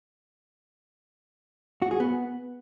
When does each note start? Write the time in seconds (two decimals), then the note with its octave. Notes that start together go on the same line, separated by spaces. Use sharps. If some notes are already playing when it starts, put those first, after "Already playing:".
1.82 F#4
1.91 G#4
2.00 B3